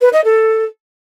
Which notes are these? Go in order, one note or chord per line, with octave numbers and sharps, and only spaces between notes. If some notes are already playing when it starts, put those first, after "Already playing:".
B4
D#5
A4